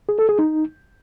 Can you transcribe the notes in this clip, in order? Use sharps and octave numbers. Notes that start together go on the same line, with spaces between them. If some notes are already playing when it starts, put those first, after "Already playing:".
G#4
A4
G#4
D#4